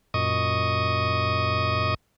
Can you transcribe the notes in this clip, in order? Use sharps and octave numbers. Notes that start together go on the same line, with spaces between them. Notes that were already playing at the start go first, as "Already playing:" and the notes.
F#2 A#2 D#5 C#6 D#6